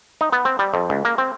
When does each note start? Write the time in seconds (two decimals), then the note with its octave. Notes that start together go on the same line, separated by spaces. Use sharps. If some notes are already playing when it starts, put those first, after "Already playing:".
0.21 D#4
0.32 B3
0.45 C4
0.59 G3
0.74 F2
0.90 C#2
1.05 A#3
1.18 C4